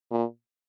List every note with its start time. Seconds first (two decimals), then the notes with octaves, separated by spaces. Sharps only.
0.11 A#2